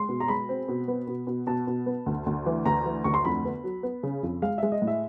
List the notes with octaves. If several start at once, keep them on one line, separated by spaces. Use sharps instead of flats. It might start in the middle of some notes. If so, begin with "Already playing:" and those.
Already playing: G#3 C6
B2
A#5
G#3 B5
C4
B2
B3
B2
B2
B2 A5
B2
B3
D2
D2
E3
D2 A#5
E3
D2 C#6
C6
F2 B5
B3
F#3
B3
C#3
F2
G#3 F5
G#3 E5
D#5
A2
E5